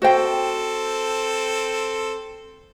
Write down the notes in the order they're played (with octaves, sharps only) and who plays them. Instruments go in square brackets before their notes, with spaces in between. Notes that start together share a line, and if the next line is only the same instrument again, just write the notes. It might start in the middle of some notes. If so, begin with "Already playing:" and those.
[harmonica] C4 A4 [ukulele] F#4 C5 G5